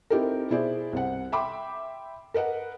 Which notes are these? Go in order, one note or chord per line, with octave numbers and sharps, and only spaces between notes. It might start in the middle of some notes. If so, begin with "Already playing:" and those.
C4 D#4 E4 G4 A4 A#4
B2 B3 E4 G#4 C5 D5
C2 C5 F#5
E5 G5 B5 C6 D6
A#4 B4 D#5 F#5